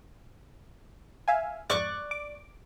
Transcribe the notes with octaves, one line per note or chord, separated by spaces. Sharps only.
E5 F5 G#5
F2 G#2 D5 C#6 F#6
D6